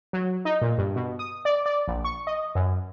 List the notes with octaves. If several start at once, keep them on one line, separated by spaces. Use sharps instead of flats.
F#3
D#4
A#2
G2
B2
D#6
D5
D5
A#1
C#6
D#5
F#2